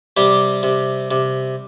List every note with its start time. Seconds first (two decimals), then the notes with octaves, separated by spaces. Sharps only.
0.17 C3 G3 G4
0.63 C3
1.11 C3